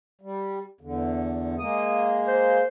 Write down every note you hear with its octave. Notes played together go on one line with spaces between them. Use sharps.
G3
E2 D3
G#3 A#3 D#6
C5